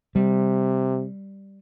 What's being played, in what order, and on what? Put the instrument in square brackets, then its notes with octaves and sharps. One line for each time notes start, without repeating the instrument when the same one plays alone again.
[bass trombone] C3 [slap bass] G3